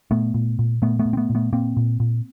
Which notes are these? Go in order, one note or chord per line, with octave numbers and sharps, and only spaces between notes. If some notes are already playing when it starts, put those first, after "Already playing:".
A#2 A3 B3
A#2
A#2
A#2 A3 B3
A3 B3
A#2
C4
A3 B3
A#2
A3 B3
A#2 A#3 C4
A#2
A#2